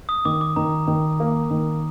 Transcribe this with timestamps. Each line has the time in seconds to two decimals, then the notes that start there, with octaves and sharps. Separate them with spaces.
0.09 D#6
0.25 D#3 D6
0.41 D6
0.56 D#3 A#5
0.87 D#3
1.20 A#3
1.51 D#3